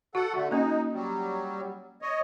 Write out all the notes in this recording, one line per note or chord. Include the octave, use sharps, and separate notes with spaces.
F#4 A4 F#5
D3 A3 F#4
A#3 C#4 D#4
F#3 G3
C#5 D#5